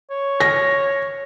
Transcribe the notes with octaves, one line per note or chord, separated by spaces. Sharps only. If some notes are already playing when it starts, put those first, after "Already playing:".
C#5
A#6